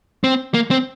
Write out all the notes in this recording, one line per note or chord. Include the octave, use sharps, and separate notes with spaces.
C4
A#3
C4